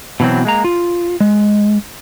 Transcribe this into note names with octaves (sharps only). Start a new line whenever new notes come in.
B2 E3 F#3 C4
G#3 A#3 A#5
F4
G#3